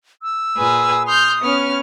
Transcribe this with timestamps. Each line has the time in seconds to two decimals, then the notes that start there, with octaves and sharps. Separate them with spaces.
0.23 E6
0.57 A#2 G#4 B4
1.06 C6 D#6 F6 G6
1.41 B3 C#4 F6